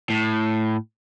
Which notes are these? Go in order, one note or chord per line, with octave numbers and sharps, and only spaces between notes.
A2